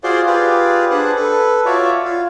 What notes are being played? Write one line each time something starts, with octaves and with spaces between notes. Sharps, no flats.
F4 F#4 G#4 C5 D5 C6
F4 G4 G#4 B4 D5
D4 G#4 B4 C5 F#5
A4 B4
F4 F#4 C#5 D5 E5
F4